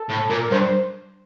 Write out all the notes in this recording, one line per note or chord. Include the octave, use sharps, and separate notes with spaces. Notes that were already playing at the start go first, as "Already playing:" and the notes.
Already playing: A4
A2
A#2 A#4
A#4
G2 C5
C5